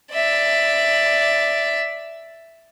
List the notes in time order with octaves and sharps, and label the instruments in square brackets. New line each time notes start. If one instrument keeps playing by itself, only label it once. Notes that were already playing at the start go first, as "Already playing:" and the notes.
[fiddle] D5 E5